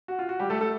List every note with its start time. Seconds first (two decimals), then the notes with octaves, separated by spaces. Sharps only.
0.08 F#4
0.19 F4
0.29 F#4
0.40 G3 G4
0.50 A3 A4
0.61 A3 A4